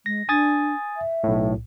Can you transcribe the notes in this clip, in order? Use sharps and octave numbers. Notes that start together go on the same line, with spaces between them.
G#3 A#6
D4 G#5 D#6 A6
E5
B1 A2